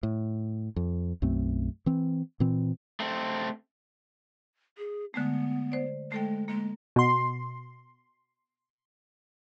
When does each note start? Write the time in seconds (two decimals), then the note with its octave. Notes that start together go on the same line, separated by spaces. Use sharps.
0.03 A2
0.76 F2
1.22 B1 F#2 A3 C4
1.86 E3 C4
2.40 A#2 E3 C4
3.00 A3 C4
4.78 G#4
5.14 D3 G#3 A3 B3
5.72 C5 D5
6.12 G#3 A3 A4 G5
6.48 G#3 A#3
6.96 B2 C6